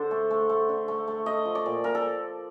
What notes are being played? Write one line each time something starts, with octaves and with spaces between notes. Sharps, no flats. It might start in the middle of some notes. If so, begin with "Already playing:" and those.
Already playing: D3 D4 A4 C5
A3
A3
A3
D3
A3
A3
A3 D#5
F3
D5
A#2
A#2 A#4
A4